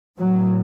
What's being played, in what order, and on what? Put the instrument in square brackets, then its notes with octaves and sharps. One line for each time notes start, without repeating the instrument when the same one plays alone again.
[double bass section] A2 F#3